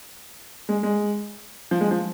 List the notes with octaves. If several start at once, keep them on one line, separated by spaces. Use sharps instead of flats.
G#3
G#3
F3
G#3
F3